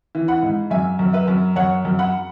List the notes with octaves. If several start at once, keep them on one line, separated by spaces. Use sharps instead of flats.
E3
F#5 B5
G#2
F#2 E5 G#5
F#2
B4 E5
F#2
F#2 C#5 F#5
F#2
F#5 B5